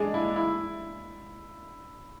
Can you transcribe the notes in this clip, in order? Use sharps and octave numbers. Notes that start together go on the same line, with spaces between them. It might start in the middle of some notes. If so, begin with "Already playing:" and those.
Already playing: G#3 D4 G#4
E4
E4